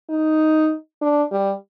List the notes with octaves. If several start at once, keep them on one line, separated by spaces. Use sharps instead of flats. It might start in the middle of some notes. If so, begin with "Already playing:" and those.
D#4
D4
G3